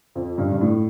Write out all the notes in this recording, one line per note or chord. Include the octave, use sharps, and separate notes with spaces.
F2
G2
G2
A2